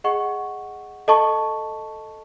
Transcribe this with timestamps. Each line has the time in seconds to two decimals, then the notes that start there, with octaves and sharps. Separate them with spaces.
0.04 G#4 D#5 F#5 C#6
1.08 A4 D#5 A5 C#6